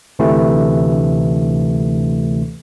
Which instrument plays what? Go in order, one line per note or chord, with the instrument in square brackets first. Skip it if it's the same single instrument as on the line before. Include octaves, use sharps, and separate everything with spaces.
[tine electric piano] D2 C3 E3 A3